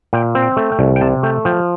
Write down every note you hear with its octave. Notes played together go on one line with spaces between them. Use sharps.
A#2 G5
C4
G5
A3
G5
C2
G5
C3 A5
A3 G5
F3 G5